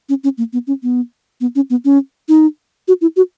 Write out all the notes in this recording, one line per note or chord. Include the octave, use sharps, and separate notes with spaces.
C#4
C#4
A#3
B3
C#4
B3
B3
C#4
B3
C#4
D#4
F#4
E4
F#4